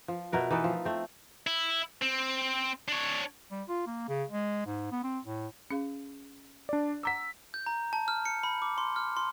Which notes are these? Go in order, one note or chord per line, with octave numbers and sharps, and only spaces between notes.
F3
B2 A3 A#4 B4
E3 D#4 A4 B4
F3
A3 C4
E4
C4
D4 C#5
G3
F4
A#3
C#3
G#3
G#2
B3
C4
A2
C#4 G#4 F5
D4 D5
F#5 A#5 D6 E6 B6
G6
A#5
A5
F6
C#7
B5
D6
C6
F6
C6